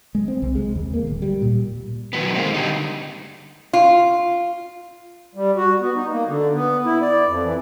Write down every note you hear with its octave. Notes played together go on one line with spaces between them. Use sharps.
G#3
C4
C2
G#3
D#2
A#3
D1
G3
A#2
D#3 F#3 B3
G#3 A#3 C4
D3 G3 D#4
F4
G3
F#4
B3
D#4
A#3
D3
B3
E4
D5
F2
E3